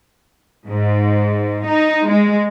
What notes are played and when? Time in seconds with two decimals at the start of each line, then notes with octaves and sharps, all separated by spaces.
0.66 G#2
1.67 D#4
2.10 G#3